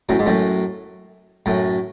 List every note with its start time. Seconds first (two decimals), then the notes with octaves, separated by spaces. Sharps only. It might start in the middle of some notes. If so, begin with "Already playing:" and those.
0.09 F#2 A2
0.19 G#2
0.26 F#2 A2
1.46 F#2 A2